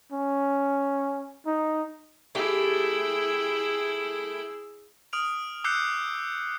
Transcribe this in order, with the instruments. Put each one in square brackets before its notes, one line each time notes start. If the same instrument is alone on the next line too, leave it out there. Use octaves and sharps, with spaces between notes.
[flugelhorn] C#4
D#4
[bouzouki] A3 G4 [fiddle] E4 G5 [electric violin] G#4 E6
[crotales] D#6 F6 D7 F7
D6 E6 F#6 G6 C7 C#7